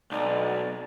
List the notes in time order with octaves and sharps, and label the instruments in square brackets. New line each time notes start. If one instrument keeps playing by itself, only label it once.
[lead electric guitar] B1 [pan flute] D5